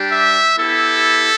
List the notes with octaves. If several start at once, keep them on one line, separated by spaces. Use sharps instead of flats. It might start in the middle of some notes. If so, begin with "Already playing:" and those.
Already playing: G3 D4 G4
E5
B3 E4 G4 A4